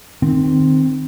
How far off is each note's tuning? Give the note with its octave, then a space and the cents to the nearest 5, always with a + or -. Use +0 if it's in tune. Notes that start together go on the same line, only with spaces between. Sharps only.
D#3 -20 C4 +0